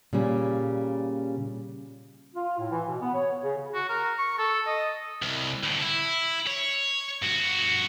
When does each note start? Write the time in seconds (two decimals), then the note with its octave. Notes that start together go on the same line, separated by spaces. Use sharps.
0.13 A#2 C#3 G3 C#4
2.34 F4
2.58 A2
2.71 E3
2.88 B2
3.01 B3
3.14 C#5
3.43 C#3
3.74 F#4
3.89 A#4
4.19 C#6
4.39 A4
4.67 D#5
5.22 C2
5.63 D2 A2
5.82 E4
6.47 C#5
7.22 G2 F#4